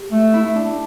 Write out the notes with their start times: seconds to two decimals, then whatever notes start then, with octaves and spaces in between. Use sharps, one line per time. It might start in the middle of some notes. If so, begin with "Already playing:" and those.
Already playing: G4
0.12 A3
0.34 E4
0.55 D4